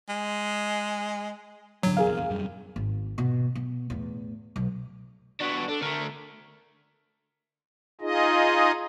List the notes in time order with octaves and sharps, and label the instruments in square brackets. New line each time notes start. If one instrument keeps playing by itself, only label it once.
[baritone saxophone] G#3
[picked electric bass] A1 G2 D3 [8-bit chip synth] F#3
[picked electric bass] F1 A#1 E2 [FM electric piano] G#4 A#4 F5
[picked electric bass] E1 F#2 G3
[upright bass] G#1
B2
B2
E2 A2
B1
[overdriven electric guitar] B3 D4 [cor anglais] F#4
[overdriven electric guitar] D4 [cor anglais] A4
[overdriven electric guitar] D3 A3 [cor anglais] A#4
[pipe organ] D#4 F4 G#4 D#5